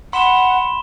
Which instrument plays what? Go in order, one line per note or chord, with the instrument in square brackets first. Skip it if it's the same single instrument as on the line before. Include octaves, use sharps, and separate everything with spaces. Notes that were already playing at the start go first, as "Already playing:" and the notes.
[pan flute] F#5 [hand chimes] B5 [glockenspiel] C6 E7 G7